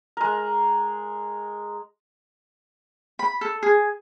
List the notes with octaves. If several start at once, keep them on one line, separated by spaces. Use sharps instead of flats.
G#3 A#4
B5
A4
G#4